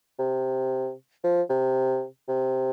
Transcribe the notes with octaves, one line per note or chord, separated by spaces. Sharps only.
C3
F3
C3
C3